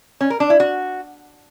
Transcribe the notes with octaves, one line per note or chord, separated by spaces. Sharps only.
C#4
A#4
D4
E4
F#4